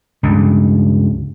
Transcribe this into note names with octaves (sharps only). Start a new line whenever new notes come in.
C#2 G2